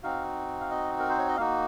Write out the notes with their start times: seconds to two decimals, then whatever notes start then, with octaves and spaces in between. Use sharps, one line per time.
0.03 C4 D#4 F#4 F5
0.60 F5
0.71 D#5
0.99 A#4
1.09 C5
1.18 C#5
1.28 D#5
1.37 A#3 D#4 F#4 F5